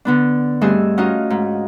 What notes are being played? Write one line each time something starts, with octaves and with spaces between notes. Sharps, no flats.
D3 B3 D4
G2 A3 C4 G#4 D#5 E6
C#4 D#4 F4 F#4 D#5
G#2